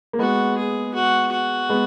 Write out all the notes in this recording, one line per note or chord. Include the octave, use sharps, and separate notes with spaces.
A#3
G#3 B3 F#4
G#4
F#4
F#4
G#3 B3